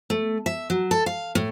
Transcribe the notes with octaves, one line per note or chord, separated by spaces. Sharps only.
A3
E5
F#3
A4
F5
A2